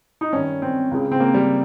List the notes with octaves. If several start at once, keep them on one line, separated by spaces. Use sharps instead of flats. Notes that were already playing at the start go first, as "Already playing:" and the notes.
D#4
G2 D#3 C#4
C4
C#2 C#3
C4
A#3
G3